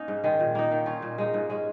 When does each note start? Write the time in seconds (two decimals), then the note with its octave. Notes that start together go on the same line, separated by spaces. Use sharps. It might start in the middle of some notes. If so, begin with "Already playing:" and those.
Already playing: A#3 C#4 D#4
0.08 G#2
0.24 D#3 G#3
0.40 A#2
0.55 A#3 D#4
0.71 D#3
0.86 C#4 F4
1.02 A#2
1.18 G#3 D#4
1.34 G#2
1.50 G#3 C#4